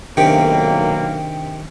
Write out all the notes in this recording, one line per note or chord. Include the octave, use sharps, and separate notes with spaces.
B1 C3 D#3 A#3 D4 G4 G5